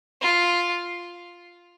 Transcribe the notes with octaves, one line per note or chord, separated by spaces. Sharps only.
F4